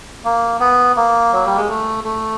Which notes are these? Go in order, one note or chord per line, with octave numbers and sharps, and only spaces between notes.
A#3
B3
A#3
F#3
G3
G#3
A3
A3